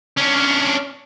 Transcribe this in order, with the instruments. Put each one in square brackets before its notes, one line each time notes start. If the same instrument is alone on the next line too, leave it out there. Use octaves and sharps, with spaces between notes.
[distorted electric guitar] C#4 D4